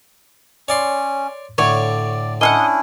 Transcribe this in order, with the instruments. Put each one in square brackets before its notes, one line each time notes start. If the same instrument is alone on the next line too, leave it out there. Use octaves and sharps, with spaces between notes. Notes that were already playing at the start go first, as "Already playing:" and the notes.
[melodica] C#4 [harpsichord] C#5 D5 C6
[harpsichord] A2 D3 [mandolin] C#5 [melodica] D5
[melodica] C#4 D4 E4 [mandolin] D#5 F5 F#5